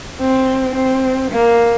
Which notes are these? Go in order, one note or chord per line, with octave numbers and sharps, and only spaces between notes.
C4
C4
A#3